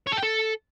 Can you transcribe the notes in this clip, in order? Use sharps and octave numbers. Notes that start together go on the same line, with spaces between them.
C#5
A4
G5
A4